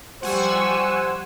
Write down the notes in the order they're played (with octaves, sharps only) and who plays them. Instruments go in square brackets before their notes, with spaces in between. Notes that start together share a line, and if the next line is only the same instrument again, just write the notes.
[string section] F3 G3 C#6 [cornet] C5 [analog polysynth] F#5 G#5 E6